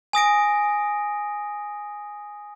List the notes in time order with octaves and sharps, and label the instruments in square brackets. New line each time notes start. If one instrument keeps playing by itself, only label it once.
[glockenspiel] G#5 D#6 A#6 D7